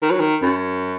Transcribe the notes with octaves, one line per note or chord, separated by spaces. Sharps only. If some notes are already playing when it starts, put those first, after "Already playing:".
D#3
F#3
D#3
F#2